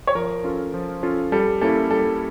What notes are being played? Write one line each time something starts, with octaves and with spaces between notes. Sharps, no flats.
C#5
F3 A#4
C#4 F4 A4
F3
C#4 F4 A4
G3 A4
A#3 C#4 E4 A4
G3 A4